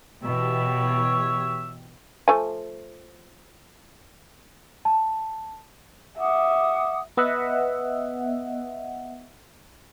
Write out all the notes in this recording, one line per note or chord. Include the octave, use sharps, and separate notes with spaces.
B2 E3 G4 C#5 E5
F3 A3 G#5
A5
E5 F#5 D6 D#6
B3 D#5 E5 F#5